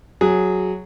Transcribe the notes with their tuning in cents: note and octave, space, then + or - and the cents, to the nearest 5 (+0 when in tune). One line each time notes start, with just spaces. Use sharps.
F#3 +0 G#4 +5